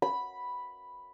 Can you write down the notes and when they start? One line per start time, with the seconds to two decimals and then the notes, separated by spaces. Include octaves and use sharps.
0.02 B5